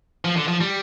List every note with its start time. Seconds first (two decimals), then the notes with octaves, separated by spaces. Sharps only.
0.25 F3
0.37 D3
0.48 F3
0.61 G3